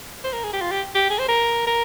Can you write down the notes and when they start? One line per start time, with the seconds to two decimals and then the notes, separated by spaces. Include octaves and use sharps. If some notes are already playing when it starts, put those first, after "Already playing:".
0.24 C5
0.33 A#4
0.43 G#4
0.53 G4
0.62 F4
0.71 G4
0.95 G4
1.10 G#4
1.19 C5
1.28 A#4
1.67 A#4